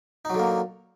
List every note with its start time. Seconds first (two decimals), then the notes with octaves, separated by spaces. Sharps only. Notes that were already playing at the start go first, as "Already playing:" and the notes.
0.25 D#4
0.30 F#3
0.34 D3
0.39 A#3